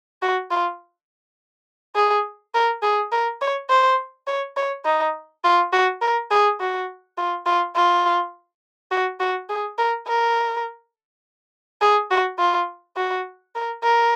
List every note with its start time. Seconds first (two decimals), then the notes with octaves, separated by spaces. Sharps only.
0.22 F#4
0.51 F4
1.96 G#4
2.54 A#4
2.82 G#4
3.12 A#4
3.41 C#5
3.69 C5
4.27 C#5
4.56 C#5
4.85 D#4
5.44 F4
5.73 F#4
6.01 A#4
6.31 G#4
6.60 F#4
7.17 F4
7.46 F4
7.75 F4
8.91 F#4
9.20 F#4
9.49 G#4
9.78 A#4
10.07 A#4
11.82 G#4
12.11 F#4
12.39 F4
12.97 F#4
13.55 A#4
13.84 A#4